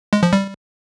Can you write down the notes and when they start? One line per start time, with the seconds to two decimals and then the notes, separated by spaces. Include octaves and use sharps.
0.13 G#3
0.23 F3
0.33 G3